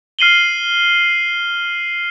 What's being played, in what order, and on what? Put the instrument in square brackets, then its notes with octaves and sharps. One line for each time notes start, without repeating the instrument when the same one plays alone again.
[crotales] F6 C7 D#7 F#7 G7